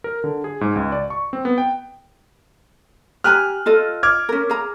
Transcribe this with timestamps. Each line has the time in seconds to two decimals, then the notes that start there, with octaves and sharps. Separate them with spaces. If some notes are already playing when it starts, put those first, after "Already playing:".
0.04 A#4
0.24 D3
0.44 G#4
0.61 G#2
0.75 C#2
0.92 D5
1.10 C#6
1.33 C4
1.45 B3
1.58 G5
3.24 G4 G#5 A#5 F6 F#6
3.66 F4 A4 D#5
4.03 D6 F6 G#6
4.29 C#4 A#4
4.50 G#4 A#5